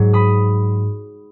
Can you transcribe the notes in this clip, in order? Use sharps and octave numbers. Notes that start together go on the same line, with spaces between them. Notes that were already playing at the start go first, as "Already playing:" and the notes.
Already playing: G#2 F#3
B5 D#6